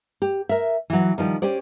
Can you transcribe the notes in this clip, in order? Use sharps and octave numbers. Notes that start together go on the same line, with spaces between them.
G4
A#4 E5
E3 F#3
D#3 F3 G3
C#4 G4 C5 D5